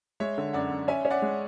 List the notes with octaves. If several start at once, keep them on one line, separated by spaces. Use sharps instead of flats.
G#3 C#5 E5
D3
F#2 D5 F#5
F#2
C#4 E5 G#5
C#4
D5 F#5
G#3